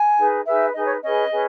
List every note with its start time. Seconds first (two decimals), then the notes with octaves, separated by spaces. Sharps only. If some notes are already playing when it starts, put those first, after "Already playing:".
Already playing: G#5
0.17 D#4 G#4 B4
0.45 D#4 G#4 B4 E5
0.74 D#4 G#4 B4 D#5
0.84 C#5
1.02 C#4 G#4 B4 D#5
1.31 C#4 G#4 B4